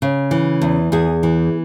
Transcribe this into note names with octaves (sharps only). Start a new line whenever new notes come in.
C#3
E3
E2
E2 G#4
E3